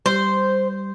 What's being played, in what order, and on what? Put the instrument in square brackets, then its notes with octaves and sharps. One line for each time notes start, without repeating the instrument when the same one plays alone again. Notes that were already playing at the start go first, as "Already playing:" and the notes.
[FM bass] G3 [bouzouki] C5